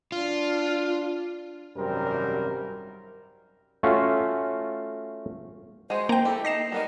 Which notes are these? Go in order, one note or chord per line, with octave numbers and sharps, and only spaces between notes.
D4 F4
G#1 F#2 C3 G3 C4 A#4
A3 C#4 F4 F#4
G#3 F#4 G#4 C5
A#3 G5 A#5
E4 G4 A4
D#4 D#5 A#6 C7 E7
G3 B3 D#4 A#4